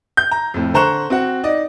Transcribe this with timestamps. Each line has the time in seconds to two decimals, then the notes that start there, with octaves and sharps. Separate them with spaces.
0.17 G6
0.31 A#5
0.54 F2 A2
0.74 D3 C5 A#5 C#6 F#6 E7
1.10 C4 F#4 F#5
1.43 D#4 D5 D#5